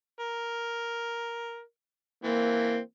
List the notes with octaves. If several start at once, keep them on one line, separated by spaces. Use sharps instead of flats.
A#4
E3 A#3 C4